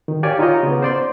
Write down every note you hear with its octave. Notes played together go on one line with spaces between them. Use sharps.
D#3
G4 C#5 D5 F5 G#5
D#4 F4 C#5 D#5
C#3 B3
C5 D5 C6